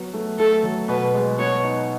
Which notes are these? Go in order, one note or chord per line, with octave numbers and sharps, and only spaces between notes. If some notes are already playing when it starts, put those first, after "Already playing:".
Already playing: F#3 B3
A3
A3 A4
F#3
B2 B4
G#3
B3 C#5
D#4